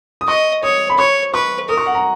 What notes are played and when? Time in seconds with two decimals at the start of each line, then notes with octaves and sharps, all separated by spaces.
0.21 D#6
0.28 D#5 C#6
0.63 C#5 D#6
0.89 B5
0.98 C#5 C#6
1.34 B4 C#6
1.69 A#4 D#6
1.77 C#6
1.86 F#5
1.95 A#5